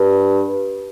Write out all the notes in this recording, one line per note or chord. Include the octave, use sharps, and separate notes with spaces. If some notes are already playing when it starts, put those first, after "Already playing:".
Already playing: G2